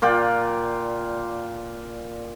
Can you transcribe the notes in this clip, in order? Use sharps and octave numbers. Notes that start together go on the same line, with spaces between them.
A#2 F4 D5 G5